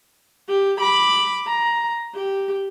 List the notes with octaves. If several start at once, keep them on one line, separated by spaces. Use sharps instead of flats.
G4
B5 D6
A#5
G4